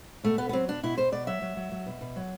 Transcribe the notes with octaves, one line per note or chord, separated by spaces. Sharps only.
B2 A3
B2 B3
B3
F#3 C4
B2 D4
B2 E4
B2 C5
B2 D5
F#3 E5
F#3
F#3
F#3
B2
B2
F#3